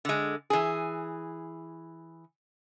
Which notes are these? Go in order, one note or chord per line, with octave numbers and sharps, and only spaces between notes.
D3 G#3
E3 G#4